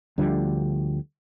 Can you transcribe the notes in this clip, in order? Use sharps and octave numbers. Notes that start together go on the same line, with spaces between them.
D2 D3 F3 G3